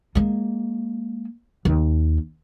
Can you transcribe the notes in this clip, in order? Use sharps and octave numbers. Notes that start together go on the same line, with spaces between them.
G#3 A#3
D#2